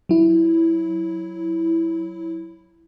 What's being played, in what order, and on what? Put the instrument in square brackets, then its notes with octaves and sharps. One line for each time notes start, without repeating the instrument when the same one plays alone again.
[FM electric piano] F#3 E4